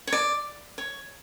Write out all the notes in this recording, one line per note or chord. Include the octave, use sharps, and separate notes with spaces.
C#5
D5
C#5